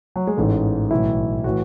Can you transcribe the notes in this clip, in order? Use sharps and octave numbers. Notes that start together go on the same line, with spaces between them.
F#3
G#3
A1 G#2 E3 A3
B1 A2 E3 E4
A2 E3 F#4